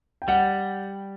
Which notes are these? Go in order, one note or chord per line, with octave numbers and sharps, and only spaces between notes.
G5
G3 F#5